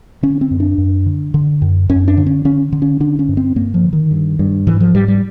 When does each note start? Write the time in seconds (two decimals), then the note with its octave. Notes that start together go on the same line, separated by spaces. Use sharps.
0.23 D3 C#4
0.41 C4
0.51 F#2
0.60 D4
0.78 F#2
1.06 D3
1.34 D3
1.62 F#2
1.89 F#2 C#4
2.08 D4
2.17 D3
2.26 C#4
2.45 D3 C#4
2.73 D3
2.82 C#4
3.00 D3 D4
3.19 C#4
3.28 G2
3.37 C4
3.56 G2 A#3
3.74 F3
3.84 D3
3.93 D#3
4.11 G2
4.39 G2
4.67 G#2 E3
4.81 F3
4.95 G#2 G3
5.08 G3